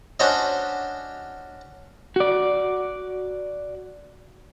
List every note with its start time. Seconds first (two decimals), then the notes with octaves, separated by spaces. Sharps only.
0.20 C#4 D4 F#4 C5 C#5 D#5
2.16 F#4 D5